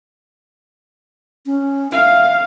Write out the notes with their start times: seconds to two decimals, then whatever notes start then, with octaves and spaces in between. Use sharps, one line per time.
1.46 C#4
1.92 E5 F5